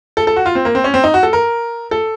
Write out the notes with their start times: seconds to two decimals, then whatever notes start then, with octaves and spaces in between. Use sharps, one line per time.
0.17 A4
0.27 A4
0.36 F#4
0.46 F4
0.55 C4
0.65 A#3
0.75 C4
0.84 C#4
0.94 C4
1.04 D#4
1.14 F#4
1.23 A4
1.33 A#4
1.91 A4